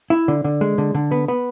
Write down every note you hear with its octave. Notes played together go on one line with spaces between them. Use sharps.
E4
D3
D3
G#3
D3
D3
B3
B3